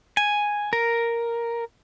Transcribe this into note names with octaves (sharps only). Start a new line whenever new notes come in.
G#5
A#4